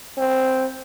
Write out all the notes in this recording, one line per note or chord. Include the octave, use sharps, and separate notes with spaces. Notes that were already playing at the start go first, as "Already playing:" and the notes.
C4